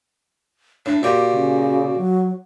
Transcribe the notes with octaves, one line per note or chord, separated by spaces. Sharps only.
A2 D4
A#2 F#4 G4
C#3
F#3